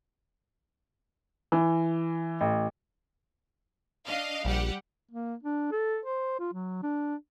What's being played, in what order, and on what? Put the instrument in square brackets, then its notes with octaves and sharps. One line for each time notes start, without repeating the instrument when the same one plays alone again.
[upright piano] E3
A1
[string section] D4 D#5 F5
[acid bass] A#1 [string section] G3 G4 F#5
[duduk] A#3
D4
A4
C5
F4
F#3
D4